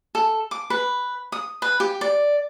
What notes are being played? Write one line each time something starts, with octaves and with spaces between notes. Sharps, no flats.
A4
D6
B4
D#6
B4
G4
D5